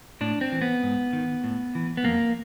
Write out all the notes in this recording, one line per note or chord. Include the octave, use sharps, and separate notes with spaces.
A2 D4
C4
E3
B3
G#2
D#3
A2
E3
B3
F2 A#3